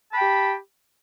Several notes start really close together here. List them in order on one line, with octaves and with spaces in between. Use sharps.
A5 B5 G5 G4